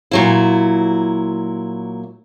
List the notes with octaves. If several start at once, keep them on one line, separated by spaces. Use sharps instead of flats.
A#2 F#3 E4